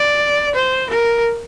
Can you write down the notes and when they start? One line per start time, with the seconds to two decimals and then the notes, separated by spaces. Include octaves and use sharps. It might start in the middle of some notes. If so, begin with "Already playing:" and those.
Already playing: D5
0.55 C5
0.90 A#4